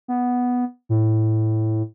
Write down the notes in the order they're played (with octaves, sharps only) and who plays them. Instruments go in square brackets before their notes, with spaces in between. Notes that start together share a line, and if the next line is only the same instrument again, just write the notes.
[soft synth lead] B3
A2